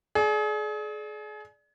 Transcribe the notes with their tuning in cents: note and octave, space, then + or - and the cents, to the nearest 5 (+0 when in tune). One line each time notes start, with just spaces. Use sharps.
G#4 +35 D5 +0